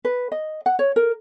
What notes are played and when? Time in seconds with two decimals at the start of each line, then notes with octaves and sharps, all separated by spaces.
0.05 B4
0.32 D#5
0.66 F#5
0.79 C#5
0.96 A#4